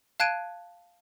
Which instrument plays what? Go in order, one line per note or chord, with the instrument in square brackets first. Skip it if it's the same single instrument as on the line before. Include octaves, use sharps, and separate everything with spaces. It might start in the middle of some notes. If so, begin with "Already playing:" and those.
[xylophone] F5 A5 F#6 G#6 D7 D#7